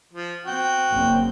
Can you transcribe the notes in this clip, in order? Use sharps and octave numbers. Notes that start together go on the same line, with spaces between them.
F3
C4 F#4 G5
F#1 A#3 C4